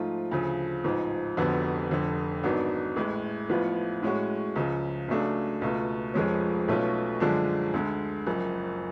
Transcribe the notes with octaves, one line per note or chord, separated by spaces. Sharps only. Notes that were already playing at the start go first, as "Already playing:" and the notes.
Already playing: G#2 F3 A3 F4
D2 C#3 F3
A1 G#2 F3
F1 F2 D3 F#3 B3
F1 F2 D3
G#1 G#2 F#3 B3 D4
A1 A2 G#3
A1 A2 F3 B3 F4
A2 G#3 C#4 F#4
C#2 C#3 F3
C#2 C#3 F#3 A3 D4
C#2 B2 A3 F4
F1 F2 F3 G#3 C#4
B1 B2 A3 C#4 F4
F#2 D3 F3 G#3 D4
D2 D3 G#3
F#1 F#2 F3